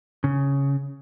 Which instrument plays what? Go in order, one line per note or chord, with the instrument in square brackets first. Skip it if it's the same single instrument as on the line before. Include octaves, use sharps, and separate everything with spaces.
[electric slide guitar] C#3